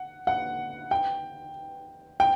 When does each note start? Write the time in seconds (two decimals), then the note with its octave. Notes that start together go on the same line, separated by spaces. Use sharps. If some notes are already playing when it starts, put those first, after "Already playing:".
Already playing: F#5
0.27 F#5
0.91 G5
2.20 G5